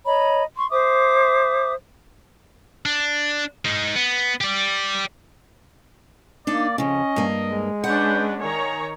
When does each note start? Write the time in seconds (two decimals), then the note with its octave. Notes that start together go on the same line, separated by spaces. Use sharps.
0.06 C#5 D#5 A#5 B5
0.57 C6 C#6
0.71 C5 E5 D6 D#6
2.86 D4
3.65 G#3 D#4
3.96 B3
4.41 G4 D5
6.47 A#3 D4 D#4 D5
6.78 F2 C#3 C#4 D#5
7.16 G2 A#3
7.46 G#3
7.84 C#4 D4 B4 F#5 G6
8.41 D#3 C#5 G#5 A#5